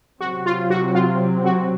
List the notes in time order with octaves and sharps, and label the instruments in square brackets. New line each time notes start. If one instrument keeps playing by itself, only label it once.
[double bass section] C3 F#3 C4 [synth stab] F#4
[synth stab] F4
F#4
F4
F#4